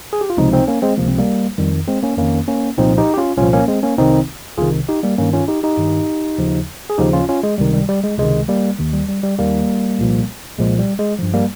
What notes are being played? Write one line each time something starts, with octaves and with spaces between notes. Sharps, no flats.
G#4
G4
F4
C#2 C3 F3 C4 D#4
C4 D#4
A#3 C#4
G#3 C4
C#2 C3 F3 A#3
C4
G3 A#3
F2 D#3 G3
G#3 C4
A#3 C#4
F2 D#3 A#3 C#4
A#3 C#4
C2 A#2 F3 C4 D#4
D#4 G4
G4
C#4 F4
C2 A#2 F3 C#4 F4
A#3 C#4
G#3 C4
A#3 C#4
C2 C3 D#3 C4 D#4
C2 C3 D#3 F4 G#4
D#4 G4
G3 A#3
G2 D#3 A#3 C#4
C#4 F4
D#4 G4
D#4 G4
G2 D#3
D#2 C#3 F3
G#4
D#2 C#3 F3 D#4 G4
C#4 F4
C#4 F4
G#3
C#2 C3 D#3 G3
G3
G3
G#3
C#2 C3 D#3 G#3
G3 A#3
D#2 D#3
G3
G3
G3
D#2 D#3 G3 A#3
C2 A#2 F3
C2 A#2 F3 G#3
G3
G#3
G2 F3
G3 A#3